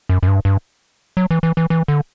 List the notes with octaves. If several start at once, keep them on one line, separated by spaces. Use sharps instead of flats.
F#2
F#2
G2
G2
F#3
E3
E3
E3
E3
D3